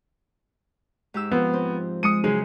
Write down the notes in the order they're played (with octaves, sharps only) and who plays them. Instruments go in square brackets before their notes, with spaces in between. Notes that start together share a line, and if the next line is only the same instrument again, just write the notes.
[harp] G#2 G4 E6
[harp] F3 C4 [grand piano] B3
[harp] C4
[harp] G#3 [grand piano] D#6 C#7 D#7
[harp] F#2 C#3 [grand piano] G#3